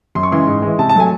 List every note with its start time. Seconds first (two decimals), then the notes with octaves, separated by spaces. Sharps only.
0.15 F#2 C6
0.23 C#6
0.31 C#3 E3 G#3 C6
0.47 G#2
0.62 E3 G#3
0.79 C3 A5
0.89 A5
0.95 F#3 A3 G#5